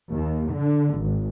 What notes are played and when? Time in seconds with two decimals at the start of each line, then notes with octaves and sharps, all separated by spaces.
0.12 D#2
0.51 D3
0.97 G#1